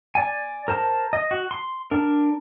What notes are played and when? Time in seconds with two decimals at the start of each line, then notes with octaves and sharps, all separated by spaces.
0.15 D5 G#5
0.68 A#4 C5 A5
1.13 D#5
1.31 F#4
1.51 C6
1.91 D4 A#4